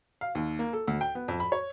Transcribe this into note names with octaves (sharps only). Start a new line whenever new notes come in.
F5
D#2
A#3
A4
D2
G5
B3
F2
B5
C#5